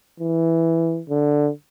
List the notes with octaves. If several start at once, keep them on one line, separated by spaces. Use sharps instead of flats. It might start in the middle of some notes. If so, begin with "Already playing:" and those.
E3
D3